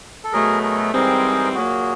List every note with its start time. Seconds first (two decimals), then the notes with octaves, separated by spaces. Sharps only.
0.24 A4
0.32 B2 F#3 A3 G#4 A#4
0.63 G#4 A#4
0.94 G#2 E3 G3 C4 G#4 A#4
1.55 A#2 F#3 A#3 F#4 G#4